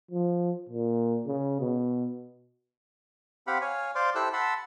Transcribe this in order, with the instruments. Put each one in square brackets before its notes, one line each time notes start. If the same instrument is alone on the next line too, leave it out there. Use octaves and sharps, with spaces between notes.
[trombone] F3
A#2
C#3
B2
[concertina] C4 G4 F5 F#5 B5
C#5 F5 G#5
C5 D5 F5 C6 D6
E4 G4 A4 C5 E6 F#6
F#5 A5 B5 C6 E6